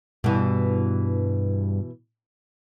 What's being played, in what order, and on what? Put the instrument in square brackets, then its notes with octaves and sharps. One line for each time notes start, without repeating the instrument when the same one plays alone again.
[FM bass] G2 [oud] B2 E3